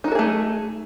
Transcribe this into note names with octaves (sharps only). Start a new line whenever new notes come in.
A3 D#4 F#4 G#4 A4